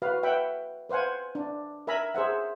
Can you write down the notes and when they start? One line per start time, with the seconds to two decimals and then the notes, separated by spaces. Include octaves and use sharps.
0.02 F#4 B4 F5
0.23 B4 E5 F#5 G5 B5
0.89 B4 C5 F5 F#5 G#5
1.35 D4
1.87 A#4 E5 G#5 A#5 B5
2.14 G#4 C5 E5 F#5